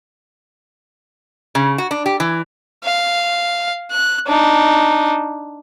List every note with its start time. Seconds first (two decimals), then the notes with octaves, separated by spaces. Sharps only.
1.55 C#3
1.78 F#4
1.91 D4
2.06 G4
2.20 E3
2.84 F5
3.91 F#6
4.27 D4 D#4